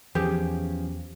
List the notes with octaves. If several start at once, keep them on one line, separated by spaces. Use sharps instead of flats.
E2 E3 F3 C#4 G4 G#4